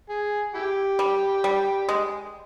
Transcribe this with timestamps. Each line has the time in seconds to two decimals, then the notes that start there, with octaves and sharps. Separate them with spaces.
0.09 G#4
0.55 E4 G4
0.99 G3
1.44 G3
1.89 G#3